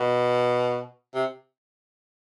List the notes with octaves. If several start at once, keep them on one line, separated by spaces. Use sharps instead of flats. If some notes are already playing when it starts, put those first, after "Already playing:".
Already playing: B2
C3